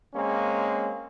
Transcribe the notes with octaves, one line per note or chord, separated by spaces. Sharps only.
G#3 A#3 C4 C#4